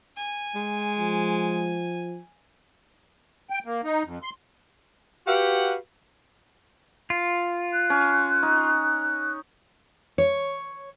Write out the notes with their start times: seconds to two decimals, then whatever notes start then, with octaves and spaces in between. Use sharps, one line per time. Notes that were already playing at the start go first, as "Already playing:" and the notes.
0.17 G#5
0.55 G#3
0.99 F3
3.50 G5
3.65 A#3
3.84 D#4
4.04 F2
4.23 C6
5.27 F#4 G4 B4 F5 F#5
7.10 F4
7.73 F#6
7.90 C#4
8.43 D#4
10.18 C#5